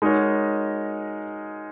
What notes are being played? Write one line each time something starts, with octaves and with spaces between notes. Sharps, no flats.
G#3 D#4 F#4 A#4 C#5